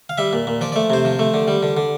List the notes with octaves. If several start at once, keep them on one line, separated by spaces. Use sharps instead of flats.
F5
G3 E5
A#2
A#2
F3 D5
A3 D5
C3 C5
F3
A3
D3
G3
D3
D3